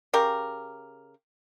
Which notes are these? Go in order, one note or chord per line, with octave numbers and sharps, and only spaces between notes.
C#3 G4 A#4